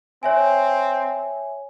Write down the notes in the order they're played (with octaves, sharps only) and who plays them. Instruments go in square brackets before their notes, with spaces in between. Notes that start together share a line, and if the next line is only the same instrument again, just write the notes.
[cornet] C4 [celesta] C#5 E5 G#5